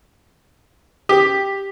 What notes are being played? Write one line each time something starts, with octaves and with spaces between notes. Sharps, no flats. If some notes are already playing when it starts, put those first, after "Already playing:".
G4